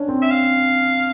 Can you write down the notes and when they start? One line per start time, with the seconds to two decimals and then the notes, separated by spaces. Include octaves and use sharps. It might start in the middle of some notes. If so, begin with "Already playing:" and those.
Already playing: C#4 D4
0.08 C4
0.22 E5
0.31 F5